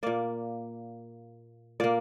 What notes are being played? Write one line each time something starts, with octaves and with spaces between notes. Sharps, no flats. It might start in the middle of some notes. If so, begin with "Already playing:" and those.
A#2 A#3 D5
A#2 A#3 D5